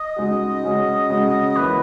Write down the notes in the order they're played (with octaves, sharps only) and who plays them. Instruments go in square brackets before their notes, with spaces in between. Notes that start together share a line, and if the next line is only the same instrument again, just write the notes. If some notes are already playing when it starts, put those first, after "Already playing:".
Already playing: [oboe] D#5
[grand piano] C#3 G#3 D#4 F#4
C#3 G#3 C#4 F#4
C#3 G#3 C#4 F#4
[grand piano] E3 A#3 E4 [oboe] B4